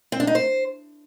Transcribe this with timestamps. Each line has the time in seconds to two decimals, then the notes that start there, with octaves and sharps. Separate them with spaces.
0.12 C4
0.20 D4
0.27 D#4
0.35 C5